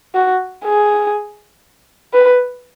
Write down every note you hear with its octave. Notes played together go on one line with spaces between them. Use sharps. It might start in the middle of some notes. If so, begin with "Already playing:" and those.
F#4
G#4
B4